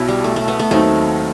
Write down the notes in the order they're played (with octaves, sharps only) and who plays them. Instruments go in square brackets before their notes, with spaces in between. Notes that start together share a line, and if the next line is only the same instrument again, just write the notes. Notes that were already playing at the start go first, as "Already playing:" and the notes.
Already playing: [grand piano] B1 B2 F#3 [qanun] E4
[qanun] G3
A3
A3
B3
A3
[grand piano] D#2 D#3 F#3 C4 D#4 [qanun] A3